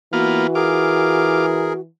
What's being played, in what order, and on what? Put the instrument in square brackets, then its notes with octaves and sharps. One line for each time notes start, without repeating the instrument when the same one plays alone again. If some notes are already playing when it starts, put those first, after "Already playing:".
[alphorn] E3 [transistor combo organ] A#3 B3 F4 [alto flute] F#4
[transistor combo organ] F4 D6 [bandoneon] G#4 A#4